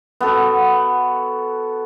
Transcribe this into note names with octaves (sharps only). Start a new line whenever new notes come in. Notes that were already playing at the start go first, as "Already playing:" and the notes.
B3 F#4 A4